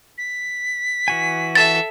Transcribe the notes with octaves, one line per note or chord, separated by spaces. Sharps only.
B6
E3 F#4 G#5
A4 E5 A6